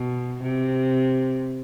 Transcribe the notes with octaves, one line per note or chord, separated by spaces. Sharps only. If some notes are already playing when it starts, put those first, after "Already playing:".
Already playing: B2
C3